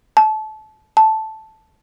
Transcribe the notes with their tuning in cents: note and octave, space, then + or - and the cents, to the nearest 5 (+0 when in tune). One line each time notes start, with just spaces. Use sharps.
A5 -25
A5 -5